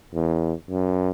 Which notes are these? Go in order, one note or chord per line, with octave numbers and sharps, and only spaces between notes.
E2
F#2